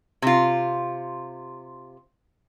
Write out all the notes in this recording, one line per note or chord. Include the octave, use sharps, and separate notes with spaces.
C3 F4